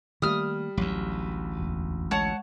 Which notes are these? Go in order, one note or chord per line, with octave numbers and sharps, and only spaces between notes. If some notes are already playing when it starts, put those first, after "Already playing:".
D#3 G3 A3 A#3 D#6 F6
A1 D2 F#3
E1
G#3 C#5 F#5 A5